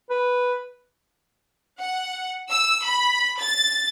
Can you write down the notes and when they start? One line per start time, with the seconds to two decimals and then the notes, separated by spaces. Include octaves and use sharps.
0.10 B4
1.79 F#5
2.50 E6
2.85 B5
3.40 A6